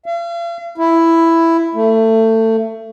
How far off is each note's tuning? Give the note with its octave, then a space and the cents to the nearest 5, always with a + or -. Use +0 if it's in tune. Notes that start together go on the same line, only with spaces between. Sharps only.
F5 -40
E4 +5
A3 +25